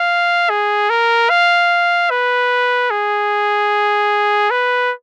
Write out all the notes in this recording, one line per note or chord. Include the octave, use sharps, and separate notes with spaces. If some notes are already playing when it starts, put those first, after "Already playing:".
Already playing: F5
G#4
A#4
F5
B4
G#4
B4